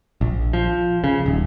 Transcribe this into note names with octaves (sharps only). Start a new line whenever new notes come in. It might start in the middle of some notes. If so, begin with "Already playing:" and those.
A#1
F3
C#3
D#1